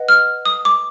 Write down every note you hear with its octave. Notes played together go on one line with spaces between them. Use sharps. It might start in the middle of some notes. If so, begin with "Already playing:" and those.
Already playing: B4 D#5 F#5
F6
D#6
D6